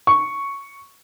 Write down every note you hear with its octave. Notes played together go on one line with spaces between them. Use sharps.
C#6